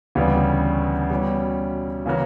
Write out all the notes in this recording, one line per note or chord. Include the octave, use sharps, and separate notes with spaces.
D2 C#3 E3 G3 B3
B2 G3 C#4 E4
C#3 E3 A#3 C#4 F#4